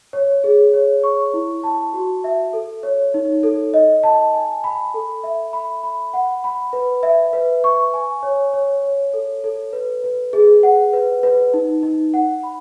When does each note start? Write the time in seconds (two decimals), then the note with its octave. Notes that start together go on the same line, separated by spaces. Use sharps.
0.13 C#5
0.44 G#4
0.73 C#5
1.04 C#6
1.34 E4
1.63 A5
1.93 F#4
2.24 E5
2.53 A4
2.83 C#5
3.14 D#4
3.43 A4
3.74 D#5
4.03 A5
4.34 G#5
4.64 B5
4.94 A4
5.23 E5
5.53 B5
5.83 B5
6.14 F#5
6.44 B5
6.73 B4
7.03 E5
7.33 B4
7.64 C#6
7.94 G#5
8.23 C#5
8.53 C#5
8.84 C#5
9.14 A4
9.44 A4
9.73 B4
10.04 B4
10.33 G#4
10.63 F#5
10.93 B4
11.23 B4
11.54 D#4
11.83 D#4
12.14 F#5
12.43 B5